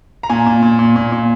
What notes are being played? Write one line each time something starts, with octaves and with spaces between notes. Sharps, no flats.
A#5
A#2 G#5
A#2
A#2
A#2
A#2
A#2